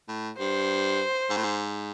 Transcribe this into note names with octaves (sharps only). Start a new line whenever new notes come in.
A2
G2 C5
G#2
A2
G#2